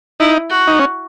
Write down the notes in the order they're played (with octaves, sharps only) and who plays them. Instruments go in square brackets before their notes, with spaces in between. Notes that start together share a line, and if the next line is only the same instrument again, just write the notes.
[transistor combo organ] D#4 [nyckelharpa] E4
[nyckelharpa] F#4
[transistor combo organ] D#4
C#4